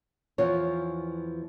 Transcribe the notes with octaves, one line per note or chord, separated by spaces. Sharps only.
E2 E3 F3 B3 F4 C#5